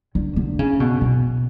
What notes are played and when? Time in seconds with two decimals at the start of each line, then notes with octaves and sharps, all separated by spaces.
0.15 D3
0.36 D3
0.59 C#3
0.80 B2
1.01 B2